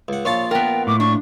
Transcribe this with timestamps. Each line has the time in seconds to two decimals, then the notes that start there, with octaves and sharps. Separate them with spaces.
0.08 C#2 F#5
0.25 A#1 F4 C#5 A5
0.51 B3 A#4 G5
0.87 A2 D6
1.00 D4 C#6